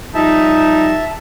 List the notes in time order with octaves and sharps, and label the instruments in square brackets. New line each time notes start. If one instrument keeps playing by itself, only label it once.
[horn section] F3 G3 D#4 [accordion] E5 A5